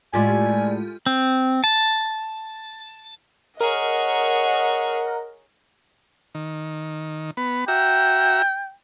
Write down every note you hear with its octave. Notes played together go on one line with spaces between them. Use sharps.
A2 G#3 F4 G4 D5 G#5
C4
A5
G#4 A#4 C#5 D#5 F#5
D#3
B3 B5
F#4 E5 G5 A#5